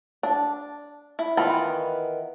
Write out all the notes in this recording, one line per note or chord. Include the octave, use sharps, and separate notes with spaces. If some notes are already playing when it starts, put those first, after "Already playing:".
D4
E4
D#3 E3 B3 F4 B5